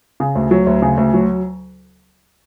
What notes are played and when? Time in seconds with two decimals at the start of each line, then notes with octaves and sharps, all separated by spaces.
0.20 C#3
0.35 D2
0.51 F#3
0.67 D2
0.82 C#3
0.98 D2
1.14 F#3